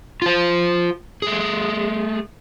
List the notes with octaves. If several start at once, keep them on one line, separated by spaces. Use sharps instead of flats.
F4 C5
A3 G#4